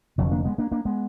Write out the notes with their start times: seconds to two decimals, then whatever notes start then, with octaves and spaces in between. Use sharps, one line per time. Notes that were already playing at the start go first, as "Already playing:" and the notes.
0.18 F1 F2 D3 F#3
0.31 A#3 D4
0.45 G#3 B3
0.58 A#3 D4
0.72 A#3 D4
0.85 G#3 B3